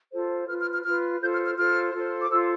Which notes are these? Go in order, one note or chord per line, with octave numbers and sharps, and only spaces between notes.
F4 A4 C5
F4 B4 F6
F6
F6
F4 B4 F6
F4 A4 C5 G6
F6
F6
F4 A4 C5 F6
F4 A4 C5
D6
F4 A4 C5 E6